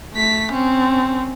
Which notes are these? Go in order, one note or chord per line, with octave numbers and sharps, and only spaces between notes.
A3 B6
C4 C#4